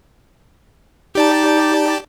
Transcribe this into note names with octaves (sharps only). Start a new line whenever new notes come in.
D#4 G4 D5 A5